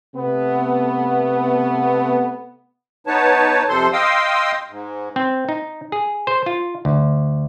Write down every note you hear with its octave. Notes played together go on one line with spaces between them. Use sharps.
C3 A3 B3
B3 D#4 B4 C#5 A5
F2 C3 F3 A4 C5 C6
D#5 F5 G5 C6 D#6 E6
G#2
C4
D#4
G#4
C5
F4
D2